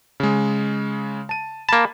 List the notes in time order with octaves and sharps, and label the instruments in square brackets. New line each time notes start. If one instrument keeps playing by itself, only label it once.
[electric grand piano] C#3 G#3
A5 D#7
[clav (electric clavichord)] A#3 A5 [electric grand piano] B5